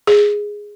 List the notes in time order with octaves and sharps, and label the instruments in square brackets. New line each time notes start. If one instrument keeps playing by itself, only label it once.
[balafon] G#4